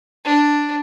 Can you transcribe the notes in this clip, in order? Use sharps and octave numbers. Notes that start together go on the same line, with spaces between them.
D4